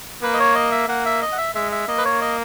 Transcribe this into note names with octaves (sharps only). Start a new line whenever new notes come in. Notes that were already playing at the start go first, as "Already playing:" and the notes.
A#3 B4
D#5
C#5
D#5
E5
A#3 F#5
E5
D#5
F#5
E5
G#3 E5
E5
A#3 D#5
B4
C#5
D#5